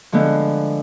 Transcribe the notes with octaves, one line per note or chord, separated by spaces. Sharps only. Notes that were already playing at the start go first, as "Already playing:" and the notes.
D3 F3 G#3 B3